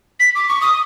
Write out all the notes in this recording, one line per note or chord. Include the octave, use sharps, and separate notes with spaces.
B6
D6
C#6
D#6